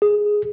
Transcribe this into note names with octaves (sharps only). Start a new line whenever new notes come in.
G#4